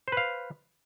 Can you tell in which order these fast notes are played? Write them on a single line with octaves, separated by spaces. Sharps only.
C5 B4 F5